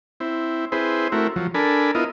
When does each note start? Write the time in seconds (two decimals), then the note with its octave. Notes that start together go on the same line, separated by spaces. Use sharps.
0.20 C4 E4
0.72 C4 E4 G#4 B4 C5
1.12 A3 C4 E4 F#4 A#4
1.36 F3 F#3
1.54 D4 A4 A#4 G#5 B5
1.95 B3 E4 F4 A#4 D#5